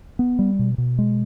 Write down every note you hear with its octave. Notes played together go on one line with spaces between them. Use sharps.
B3
G3
B2
B2
G#3